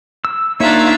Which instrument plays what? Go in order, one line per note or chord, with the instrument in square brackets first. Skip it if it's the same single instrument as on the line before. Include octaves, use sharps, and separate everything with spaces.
[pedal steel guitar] E6
[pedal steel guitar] A#3 D#4 C#5 [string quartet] D4 F4 E5